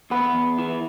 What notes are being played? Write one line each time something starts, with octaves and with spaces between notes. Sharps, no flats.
E2 B3 B4
E2
E3